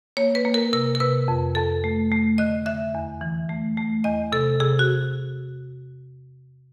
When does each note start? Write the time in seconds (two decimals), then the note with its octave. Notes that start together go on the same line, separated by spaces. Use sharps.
0.17 A#3 C#5
0.35 B4
0.45 A#3
0.54 A#4
0.73 C3 A#4
0.95 A#4
1.00 C3 B4
1.28 F2
1.55 F2 A4
1.84 A3
2.12 A3
2.38 D3 D#5
2.66 D3 E5
2.95 E2
3.21 E3
3.49 A3
3.77 A3
4.04 E2 D#5
4.32 C3 A4
4.60 C3 G#4
4.79 F#4